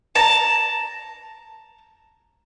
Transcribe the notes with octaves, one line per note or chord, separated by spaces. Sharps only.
A5 A#5